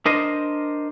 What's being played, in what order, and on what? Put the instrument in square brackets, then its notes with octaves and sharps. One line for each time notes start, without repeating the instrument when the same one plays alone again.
[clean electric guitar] D4 A#4 C5 D#5